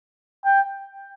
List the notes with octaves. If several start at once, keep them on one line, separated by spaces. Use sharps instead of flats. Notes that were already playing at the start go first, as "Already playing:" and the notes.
G5